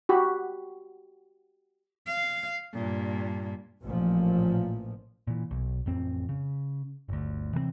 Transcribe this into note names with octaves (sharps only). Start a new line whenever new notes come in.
F#4 G4 B5
F5
G2 A#2
A1 A#2 F3
A#2 E3
B1
A1 F2 C4
C#3
G1 D2
C3 E3 G3 C4